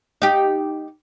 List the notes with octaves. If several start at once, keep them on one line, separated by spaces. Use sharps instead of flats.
D#4 G4